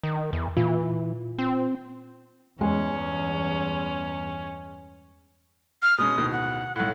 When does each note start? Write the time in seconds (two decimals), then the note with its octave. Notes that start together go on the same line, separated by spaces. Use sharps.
0.03 D#3
0.33 E2
0.57 A#2 E3 F4
1.39 C4
2.61 E2 G2 G#3 C#4
5.82 F6
5.98 B2 G#3 C#4 D#6
6.17 D1 B2 D#3
6.32 F#5
6.76 B1 A2 F#5